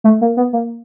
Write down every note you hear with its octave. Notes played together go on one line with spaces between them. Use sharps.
A3
A#3
B3
A#3